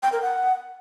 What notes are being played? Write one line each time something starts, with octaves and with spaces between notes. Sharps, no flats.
G5
A#4
F#5